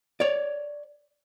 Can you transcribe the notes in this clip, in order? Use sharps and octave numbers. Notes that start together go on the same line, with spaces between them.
C#5 D5